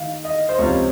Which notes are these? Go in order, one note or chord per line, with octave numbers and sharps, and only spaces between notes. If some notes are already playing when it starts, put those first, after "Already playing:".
Already playing: D#3 F5
D#5
C5
C#2 C3 F3 C#5